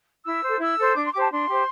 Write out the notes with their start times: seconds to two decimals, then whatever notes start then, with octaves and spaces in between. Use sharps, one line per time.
0.25 E4 E6
0.43 A4 C5
0.60 E4 E6
0.78 A4 C5
0.95 D4 D6
1.05 C6
1.13 G4 C5 D6
1.22 A5
1.31 D4 C6
1.48 G4 C5